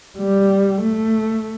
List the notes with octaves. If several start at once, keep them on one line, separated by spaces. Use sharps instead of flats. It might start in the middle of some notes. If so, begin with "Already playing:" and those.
G3
A3